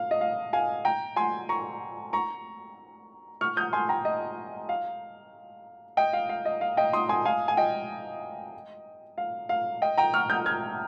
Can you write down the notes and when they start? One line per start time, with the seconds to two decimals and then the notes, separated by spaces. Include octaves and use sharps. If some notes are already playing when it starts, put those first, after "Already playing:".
Already playing: F5
0.11 D#5
0.21 F5
0.53 F5 G#5
0.85 G5 A#5
1.16 G#5 C6
1.49 A#5 C#6
2.13 A#5 C#6
3.41 C#6 F6
3.57 D#6 G6
3.73 G#5 C6
3.89 G5 A#5
4.05 D#5
4.69 F5
5.97 D#5 G5
6.13 F5
6.29 F5
6.45 D#5
6.61 F5
6.77 D#5 G5
6.93 C6 D#6
7.09 G#5 C6
7.25 F5 G#5
7.48 G#5
7.57 D#5 G5
9.18 F5
9.49 F5
9.82 D#5 G5
9.98 G5 A#5
10.14 C#6 F6
10.30 D#6 G6
10.46 F6 G#6